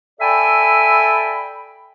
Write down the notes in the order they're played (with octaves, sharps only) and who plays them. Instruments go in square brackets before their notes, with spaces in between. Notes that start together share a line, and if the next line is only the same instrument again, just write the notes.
[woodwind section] A4 D5 E5 G5 G#5 B5